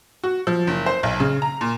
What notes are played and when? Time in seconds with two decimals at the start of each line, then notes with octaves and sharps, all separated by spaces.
0.24 F#4
0.47 F3
0.67 F#1
0.86 C5
1.03 B1
1.20 C#3
1.42 A#5
1.61 A#2